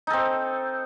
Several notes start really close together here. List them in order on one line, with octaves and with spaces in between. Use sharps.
D#4 A4 C4